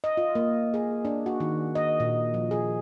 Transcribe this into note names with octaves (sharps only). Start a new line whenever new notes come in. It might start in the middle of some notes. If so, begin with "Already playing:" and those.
D#5
F4
A#3
G#4
D4
F#4
D#3
D#5
A#2
F3
G#4